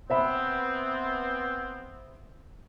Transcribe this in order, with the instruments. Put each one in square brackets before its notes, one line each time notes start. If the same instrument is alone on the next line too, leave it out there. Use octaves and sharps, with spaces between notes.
[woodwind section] B3 C4 [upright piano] C5 E5 B5